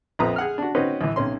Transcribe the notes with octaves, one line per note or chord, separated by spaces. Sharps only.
A#1 F2 F3 B4 A#5 D#6
G#4 F#5 F6
D4 F#4
C4 C#4 D#4 F#4 B4 C5
A#1 E3
B1 C3 C#4 C6